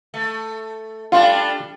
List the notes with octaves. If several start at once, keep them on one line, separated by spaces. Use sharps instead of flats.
A3
G3 A3 D4 F4